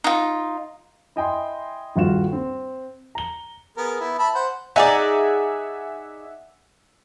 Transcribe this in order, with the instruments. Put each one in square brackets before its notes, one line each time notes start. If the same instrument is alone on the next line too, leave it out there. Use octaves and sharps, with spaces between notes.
[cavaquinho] D#4 F4
[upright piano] E4 D#5 G5 G#5 C6
D#1 G2 F4 F#4 E7
C4
A#5 G7
[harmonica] B3 G#4 A#4
B3 E4
E5 A5 B5
C5 F#5
[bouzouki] D#4 G#4 D5 [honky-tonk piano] E5 F#5 G#5